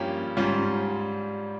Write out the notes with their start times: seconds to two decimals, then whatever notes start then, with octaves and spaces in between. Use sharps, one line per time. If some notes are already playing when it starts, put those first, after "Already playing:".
Already playing: G2 F3 A#3 C#4 G4
0.37 G#2 G3 C#4 F4